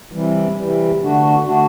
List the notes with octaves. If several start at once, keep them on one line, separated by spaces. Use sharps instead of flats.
C3 E3 G3
C3 E3 G3
D3 A3 D4 F#4
D3 A3 D4 F#4